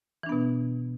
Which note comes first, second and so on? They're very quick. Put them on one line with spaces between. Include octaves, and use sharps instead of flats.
E3 D4 B3 B2